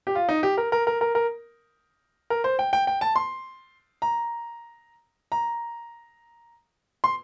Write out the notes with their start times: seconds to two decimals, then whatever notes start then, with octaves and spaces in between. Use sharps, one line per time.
0.07 G4
0.15 F4
0.29 D#4
0.43 G4
0.58 A#4
0.72 A#4
0.87 A#4
1.01 A#4
1.15 A#4
2.30 A#4
2.44 C5
2.59 G5
2.73 G5
2.87 G5
3.01 A5
3.16 C6
4.02 A#5
5.32 A#5
7.04 C6